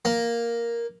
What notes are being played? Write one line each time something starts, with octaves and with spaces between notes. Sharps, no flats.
A#3